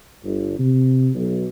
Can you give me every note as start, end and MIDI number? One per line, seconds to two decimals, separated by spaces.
0.24 0.57 31
0.59 1.09 48
1.15 1.46 35